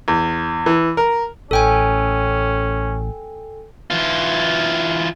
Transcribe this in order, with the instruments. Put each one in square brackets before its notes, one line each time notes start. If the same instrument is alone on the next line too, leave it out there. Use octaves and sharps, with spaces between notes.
[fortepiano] E2
E3
A#4
[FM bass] A1 [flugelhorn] C#4 [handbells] A4 G5 G#5
[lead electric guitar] E3 F4